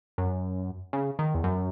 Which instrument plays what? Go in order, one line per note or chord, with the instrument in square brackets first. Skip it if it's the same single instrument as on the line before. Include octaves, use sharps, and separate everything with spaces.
[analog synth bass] F#2
C#3
D#3
E2
F#2